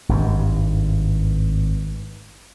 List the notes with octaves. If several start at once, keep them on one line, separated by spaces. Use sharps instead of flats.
G#1 G2